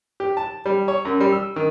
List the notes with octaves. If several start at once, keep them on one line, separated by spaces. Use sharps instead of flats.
G4
A5
G3
C#5
F#2
G3
E6
D#3